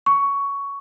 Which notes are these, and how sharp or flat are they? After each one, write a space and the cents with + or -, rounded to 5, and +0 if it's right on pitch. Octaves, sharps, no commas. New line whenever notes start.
C#6 +10